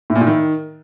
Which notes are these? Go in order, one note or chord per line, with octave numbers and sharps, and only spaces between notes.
A2
A#2
A2
D#3